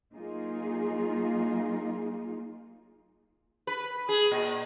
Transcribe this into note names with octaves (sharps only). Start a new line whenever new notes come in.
F#3 A#3 D#4 F4 G#4
B4
G#4
A#2